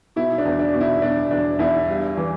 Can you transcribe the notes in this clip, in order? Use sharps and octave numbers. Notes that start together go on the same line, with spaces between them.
B2 E4
D4
E2
D4
B2
E4
B2 D4
E2 D4
E2 E4
G2
E3